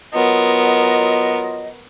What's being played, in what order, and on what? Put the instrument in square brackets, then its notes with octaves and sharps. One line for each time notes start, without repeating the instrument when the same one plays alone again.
[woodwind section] F#3 F4 D#5 [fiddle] B3 A#4